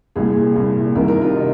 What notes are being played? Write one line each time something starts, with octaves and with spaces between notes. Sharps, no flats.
C2 A#2 G#4
C2 A#2
C2 C3 D#3 A#4
A#4
F4
C3 D#4